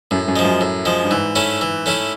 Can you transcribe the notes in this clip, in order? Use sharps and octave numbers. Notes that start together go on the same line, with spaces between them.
F#2 A2
F#2
F3 G#3
F#2
A2
F3 G#3
G2
G#2 E3
A3 C#4 E4
E3
A3 C#4 E4